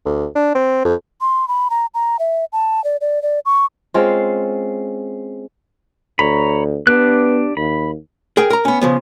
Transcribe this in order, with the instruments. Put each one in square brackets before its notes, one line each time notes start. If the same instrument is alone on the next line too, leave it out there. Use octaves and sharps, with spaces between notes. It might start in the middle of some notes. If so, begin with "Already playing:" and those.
[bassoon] D2
D4
C4
F2
[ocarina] C6
B5
A#5
A#5
E5
A5
D5
D5
D5
C#6
[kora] G#3 C4 C#4 F4
[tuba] D2 [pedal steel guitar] C#5 A#5 B5
[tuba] B3 [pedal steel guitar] D4 G4 F#6
[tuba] D#2 [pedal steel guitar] B5
[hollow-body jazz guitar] G#4 A#4 G5
A#4 A#5
B3 C#4
C#3 F3 B3